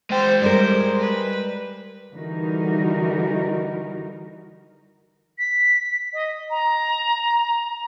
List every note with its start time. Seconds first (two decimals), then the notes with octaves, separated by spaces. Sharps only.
0.10 G#3 C5 G5
0.42 G3 G4 A#4 C5
0.99 B4
2.12 D3 E3 G3 D#4 F#4 A#4
5.38 B6
6.13 D#5
6.50 A#5